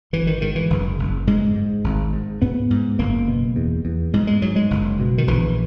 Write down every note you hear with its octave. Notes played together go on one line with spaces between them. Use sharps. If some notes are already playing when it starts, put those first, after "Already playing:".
G#1 E3
D#3
G#2 D#3
E3
F#1
F#1
G#2 G#3
G#2
G#1
G#2
G#2 B3
G#2
F#1 A#3
B2
E2
E2
G#2 G#3
G#3
G#2 F#3
G#3
F#1
B2
D#3
A#1 E3